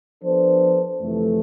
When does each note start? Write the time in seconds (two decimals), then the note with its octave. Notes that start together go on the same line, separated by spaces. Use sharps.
0.21 F3 B3 D4 A4 C5
1.01 F2 C3 E3 A3